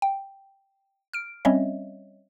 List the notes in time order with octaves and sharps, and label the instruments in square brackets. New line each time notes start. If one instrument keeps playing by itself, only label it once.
[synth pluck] G5
F6 D7
G3 C4 C#4 C#5 D#5 E5